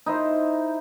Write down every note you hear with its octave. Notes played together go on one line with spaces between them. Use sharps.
D#4 E4 C5